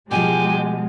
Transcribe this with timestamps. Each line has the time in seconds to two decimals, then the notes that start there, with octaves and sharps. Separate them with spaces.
0.11 B2 F3 G#3 G4 G#5